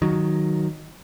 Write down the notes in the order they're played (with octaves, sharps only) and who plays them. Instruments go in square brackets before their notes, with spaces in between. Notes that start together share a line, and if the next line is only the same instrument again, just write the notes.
[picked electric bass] D#3 F#3